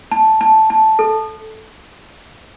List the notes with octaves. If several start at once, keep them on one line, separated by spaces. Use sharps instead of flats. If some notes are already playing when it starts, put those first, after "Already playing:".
A5
A5
A5
A4